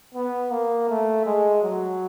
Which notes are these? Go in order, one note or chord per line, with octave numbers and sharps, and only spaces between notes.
B3
A#3
A3
G#3
F#3